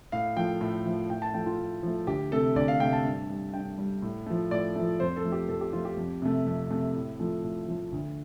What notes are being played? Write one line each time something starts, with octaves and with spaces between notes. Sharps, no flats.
A2 F5
F3 A3 G5
A2
F3 A3
A2 G5
A5
F3 A3 G5
F4
A2
F3 A3
D2 G4
C3 A3 A4
D2 D5
F5
C3 A3 G5
A5
G2
G3
G2 G5
G3
A2
F3 A3
A2 D5
F3 A3
F2 C5
A4
F3 A3
G4
F2 A4
G4
F3 A3 F4
G4
F2
C3 A3
F2
C3 A3
A2
F3 A3
A2
F3 A3
D2